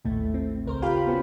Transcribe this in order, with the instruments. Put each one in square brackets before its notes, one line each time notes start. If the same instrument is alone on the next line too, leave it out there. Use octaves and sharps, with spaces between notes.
[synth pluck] A1 D#2 A2 A3
C4
C#2 A#4 C5
F4 G4 F5 G5 B5
B3 C#4 F#4